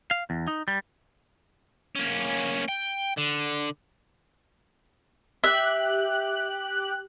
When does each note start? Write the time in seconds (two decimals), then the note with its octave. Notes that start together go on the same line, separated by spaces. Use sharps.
0.11 F5
0.30 E2
0.48 D#4
0.68 G3
1.96 A#3 C#4
2.69 G5
3.17 D3
5.44 G4 E5 F#6